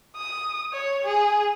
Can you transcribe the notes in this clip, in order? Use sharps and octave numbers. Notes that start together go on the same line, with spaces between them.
D#6
C#5
G#4